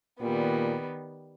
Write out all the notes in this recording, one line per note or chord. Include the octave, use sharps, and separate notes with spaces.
A#2 D#3 G3 B3